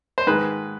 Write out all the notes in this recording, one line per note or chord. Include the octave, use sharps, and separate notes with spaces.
C5
G#2 D#3 G#3 B4